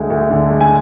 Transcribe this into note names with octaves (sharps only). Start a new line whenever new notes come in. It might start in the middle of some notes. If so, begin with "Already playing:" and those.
Already playing: D2 D3 G#3
D2
D3
G#3
G#5